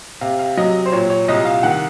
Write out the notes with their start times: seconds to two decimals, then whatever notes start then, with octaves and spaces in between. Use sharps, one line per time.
0.21 C3 F5
0.39 F5
0.57 F#3 D#5
0.86 C5
0.92 A#2 C#5
1.10 C#5
1.28 C2 D#5
1.45 F5
1.63 D#3 F#5